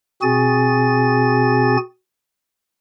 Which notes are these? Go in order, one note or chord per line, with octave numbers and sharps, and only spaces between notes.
B2 C4 F#4 G#4 G#5 A6